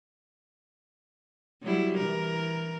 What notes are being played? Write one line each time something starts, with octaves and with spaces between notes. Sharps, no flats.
F#3 G3 E4
E3 A#4